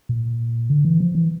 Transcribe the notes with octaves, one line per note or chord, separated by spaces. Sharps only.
A#2
D3
E3
F3
E3